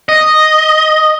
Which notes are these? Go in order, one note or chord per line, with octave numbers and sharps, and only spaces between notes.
D#5